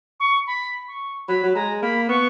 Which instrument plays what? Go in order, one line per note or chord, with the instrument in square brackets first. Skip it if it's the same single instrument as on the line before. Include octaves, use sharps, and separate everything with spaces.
[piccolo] C#6
B5
C#6
[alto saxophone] F#3 [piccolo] B5
[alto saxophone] F#3
[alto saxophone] G#3 [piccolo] A#5
[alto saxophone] A#3 [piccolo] B5
[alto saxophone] B3 [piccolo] C#6